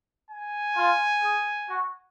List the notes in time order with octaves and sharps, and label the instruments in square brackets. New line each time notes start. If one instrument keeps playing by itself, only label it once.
[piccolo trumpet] G#5
[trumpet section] F4
G#4
F#4